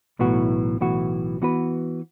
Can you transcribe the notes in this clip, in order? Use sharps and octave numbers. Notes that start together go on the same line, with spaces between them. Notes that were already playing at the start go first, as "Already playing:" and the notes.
B1 A2 E3 B3 F#4
B1 A2 E3 B3 F#4
E3 B3 F#4 B4